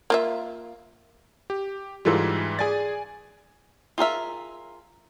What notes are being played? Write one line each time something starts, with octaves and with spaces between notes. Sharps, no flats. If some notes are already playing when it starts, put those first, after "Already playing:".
A#3 F4 E5
G4
G#2 E3 G3 F4 A4
G#4 D5 G#5 A6
F4 G#4 A#4 E5